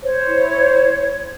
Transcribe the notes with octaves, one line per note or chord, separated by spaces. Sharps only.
C5 C#5
E4
C5